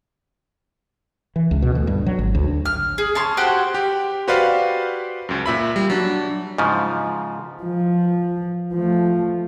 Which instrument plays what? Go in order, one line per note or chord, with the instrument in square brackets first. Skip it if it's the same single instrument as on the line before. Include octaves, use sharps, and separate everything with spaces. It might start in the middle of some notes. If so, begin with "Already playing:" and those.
[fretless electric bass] E3
C#2
B2
D2
G2
F#3
G#1
D2
[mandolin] F6
G#4
C#4 A5 C6
F#4 G4 C5 F#5
[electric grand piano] G4
F#4 G4 B4 C5 D5 F5
C#2 F#2
A#2 E5 B5
G3
F#3 D4
[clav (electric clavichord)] G#2 C#3 F3
[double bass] F3
F3 A3